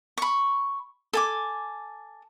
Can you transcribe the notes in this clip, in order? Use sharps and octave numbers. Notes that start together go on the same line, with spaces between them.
B5 C#6
A4 G#5 D6